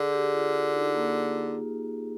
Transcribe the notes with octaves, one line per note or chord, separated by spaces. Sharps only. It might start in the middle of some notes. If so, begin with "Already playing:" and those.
Already playing: D3 G#4
G4
F4
F4
D#4
A#3